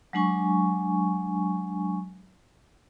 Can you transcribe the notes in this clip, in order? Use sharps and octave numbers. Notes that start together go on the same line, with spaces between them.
F#3 G#3 D4 G#5 C#6